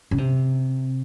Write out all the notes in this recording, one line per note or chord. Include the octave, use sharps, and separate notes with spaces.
C#3
C3